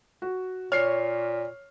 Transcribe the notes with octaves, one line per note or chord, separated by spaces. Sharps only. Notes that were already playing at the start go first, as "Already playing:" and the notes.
F#4
A#2 C#5 F6 C7